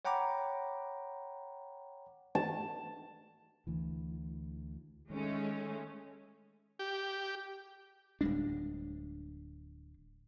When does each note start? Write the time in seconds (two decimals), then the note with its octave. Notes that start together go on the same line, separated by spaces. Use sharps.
0.05 C#5 F#5 G5 A#5 B5 D6
2.35 A5
3.67 D2 E3
5.10 D#3 G#3 A3 C#4
6.79 G4
8.21 D1 G3 G#3 D4